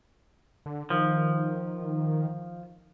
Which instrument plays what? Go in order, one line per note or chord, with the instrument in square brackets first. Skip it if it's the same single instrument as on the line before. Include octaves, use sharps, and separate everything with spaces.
[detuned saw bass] D3
[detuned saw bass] D#3 [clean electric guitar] F3